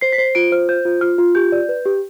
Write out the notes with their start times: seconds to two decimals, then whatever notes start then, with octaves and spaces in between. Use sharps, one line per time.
0.01 C5 C7
0.13 B6
0.18 C5 C7
0.35 F4 D7
0.52 C5 F6
0.69 C5 G6
0.85 F4
1.01 F4 F6
1.18 F4
1.35 G4 G6
1.52 D5
1.69 B4
1.85 G4